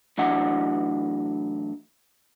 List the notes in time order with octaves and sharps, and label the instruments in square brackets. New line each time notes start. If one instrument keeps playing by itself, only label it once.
[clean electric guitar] A2 E3 F#3 D4 F#5